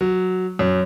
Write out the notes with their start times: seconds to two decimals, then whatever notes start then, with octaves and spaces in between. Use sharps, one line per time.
0.01 F#3
0.59 F#2